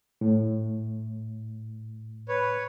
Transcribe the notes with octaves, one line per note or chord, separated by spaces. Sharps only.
A2
B4 C#5